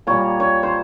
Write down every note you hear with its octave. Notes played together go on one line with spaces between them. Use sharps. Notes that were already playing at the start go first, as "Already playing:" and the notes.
A#2 G3 A#3 C#5
C#5
C5